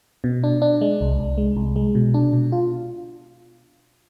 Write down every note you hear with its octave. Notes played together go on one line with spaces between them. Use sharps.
B2
D4
D4
G#3
C2
C2
G#3
C2
G#3
B2
D4
B2
F4